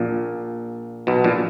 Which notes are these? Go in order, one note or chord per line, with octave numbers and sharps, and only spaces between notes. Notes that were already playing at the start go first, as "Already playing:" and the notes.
Already playing: A#1 A#2
B1 B2
A#1 A#2